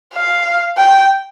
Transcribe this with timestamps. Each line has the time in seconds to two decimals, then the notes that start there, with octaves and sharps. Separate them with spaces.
0.14 F5
0.77 G5